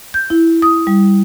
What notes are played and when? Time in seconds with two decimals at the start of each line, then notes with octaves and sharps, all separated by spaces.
0.14 G6
0.30 E4
0.62 D#6
0.87 G3